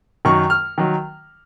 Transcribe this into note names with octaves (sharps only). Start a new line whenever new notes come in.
F#2 D#3 F#3 C#6
F6
D#3 F#3